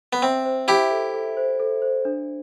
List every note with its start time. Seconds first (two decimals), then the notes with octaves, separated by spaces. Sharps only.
0.13 B3
0.22 C4 E5
0.45 C5
0.68 E4 G4 E5
0.91 A4
1.14 A4
1.37 C5
1.59 A4
1.82 C5
2.05 D4